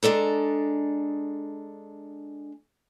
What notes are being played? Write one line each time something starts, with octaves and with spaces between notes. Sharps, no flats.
G#3 D4 A4 A#5